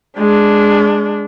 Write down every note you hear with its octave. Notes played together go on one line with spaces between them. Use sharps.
G#3 D4